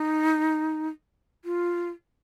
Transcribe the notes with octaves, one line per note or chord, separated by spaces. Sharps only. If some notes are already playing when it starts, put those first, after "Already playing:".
Already playing: D#4
F4